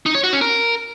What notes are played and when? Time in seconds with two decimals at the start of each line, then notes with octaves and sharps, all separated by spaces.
0.06 D#4
0.15 C#5
0.24 F#4
0.33 C#4
0.41 A#4